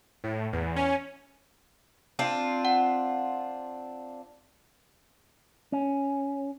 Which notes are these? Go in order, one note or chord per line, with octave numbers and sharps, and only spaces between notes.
A2
E2
C#4
C4 D4 F4
F#5
C#4